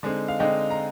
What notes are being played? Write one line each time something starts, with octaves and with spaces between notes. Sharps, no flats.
D3 G#3 C4 D#4
F5
D3 G#3 C4 D#4 D#5 G5
A#5